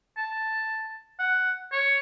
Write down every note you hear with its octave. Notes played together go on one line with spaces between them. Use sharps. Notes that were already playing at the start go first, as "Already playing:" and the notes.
A5
F#5
C#5